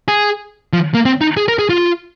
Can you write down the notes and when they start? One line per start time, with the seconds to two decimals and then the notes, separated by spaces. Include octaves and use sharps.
0.08 G#4
0.73 F3
0.94 A#3
1.05 C4
1.21 D#4
1.37 G#4
1.48 A#4
1.59 G#4
1.69 F4